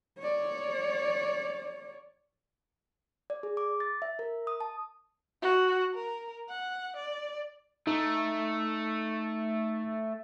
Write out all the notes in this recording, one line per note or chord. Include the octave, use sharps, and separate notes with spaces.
C#5 D5
D5
G#4
D6
A6
E5
A#4
D#6
A5
F#4
A#4
F#5
D5
A3 D#4